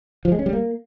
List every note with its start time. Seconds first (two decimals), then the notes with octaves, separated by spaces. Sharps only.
0.25 F3
0.32 G#3
0.39 C#4
0.46 G3
0.53 A#3